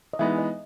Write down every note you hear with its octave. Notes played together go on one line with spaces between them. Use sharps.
D#5
E3 G#3 B3 D#4 E5
D#5